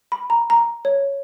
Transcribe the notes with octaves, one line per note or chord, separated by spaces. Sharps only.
B5
A#5
A#5
C#5